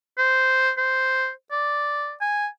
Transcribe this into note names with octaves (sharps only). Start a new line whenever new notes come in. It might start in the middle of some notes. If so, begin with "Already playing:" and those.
C5
C5
D5
G#5